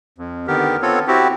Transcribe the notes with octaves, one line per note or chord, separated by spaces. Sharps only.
F2
D3 D#3 B3 G4 A#4
B3 C4 F4 A4 C#5
C4 E4 F#4 G4